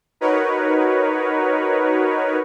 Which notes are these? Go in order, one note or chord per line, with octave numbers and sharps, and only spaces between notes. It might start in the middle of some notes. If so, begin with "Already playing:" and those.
D#4 F#4 A#4 B4 C#5